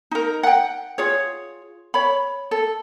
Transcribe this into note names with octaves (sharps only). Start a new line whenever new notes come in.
D#4 A#4
F#5 G5
F4 G#4 C#5
C#5 B5
A4